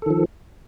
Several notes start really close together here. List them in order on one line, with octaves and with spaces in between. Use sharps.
A4 D#3 F3